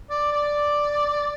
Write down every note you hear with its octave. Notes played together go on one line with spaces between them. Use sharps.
D5
D5